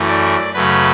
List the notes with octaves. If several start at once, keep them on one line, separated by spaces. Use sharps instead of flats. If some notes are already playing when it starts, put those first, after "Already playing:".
Already playing: F#2 E3 A3
D5
F#2 C#3 F#3 A3 B4